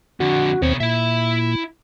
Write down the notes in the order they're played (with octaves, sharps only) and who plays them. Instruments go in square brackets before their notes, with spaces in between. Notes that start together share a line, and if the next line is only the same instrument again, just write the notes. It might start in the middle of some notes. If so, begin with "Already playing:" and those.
[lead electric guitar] F2 D3 [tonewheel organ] F#4
[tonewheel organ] D#2 C4 [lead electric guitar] B2 C#5
[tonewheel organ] A#2 [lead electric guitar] E4 E5